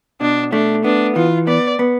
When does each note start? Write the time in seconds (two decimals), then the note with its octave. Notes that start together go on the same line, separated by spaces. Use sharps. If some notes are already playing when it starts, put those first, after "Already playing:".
0.21 B2 D4
0.52 A3 D4
0.84 B3 D4
1.16 E3 F4
1.47 B3 D5
1.79 B3